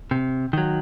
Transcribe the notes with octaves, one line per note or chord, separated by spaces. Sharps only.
C3
D#3 F#3